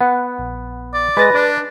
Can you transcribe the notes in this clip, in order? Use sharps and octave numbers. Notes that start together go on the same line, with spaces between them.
B3 F#5
A#1
D5
G#3 B4 B5 A6 A#6
D4 D5